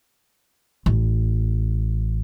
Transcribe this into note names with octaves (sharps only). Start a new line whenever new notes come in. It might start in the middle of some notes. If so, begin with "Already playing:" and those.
A1